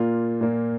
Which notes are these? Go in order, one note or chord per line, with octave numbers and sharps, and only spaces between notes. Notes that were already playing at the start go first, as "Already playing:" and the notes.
Already playing: A#2 A#3 F4
A#2 A#3